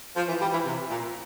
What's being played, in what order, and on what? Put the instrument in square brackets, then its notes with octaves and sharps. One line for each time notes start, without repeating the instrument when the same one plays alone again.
[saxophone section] F3
E3
G3
E3
C3
A#2